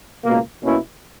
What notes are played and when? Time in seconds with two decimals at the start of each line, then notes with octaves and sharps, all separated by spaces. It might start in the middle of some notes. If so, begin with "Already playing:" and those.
0.23 C#2 B2 A#3
0.61 B2 A#3 C#4 E4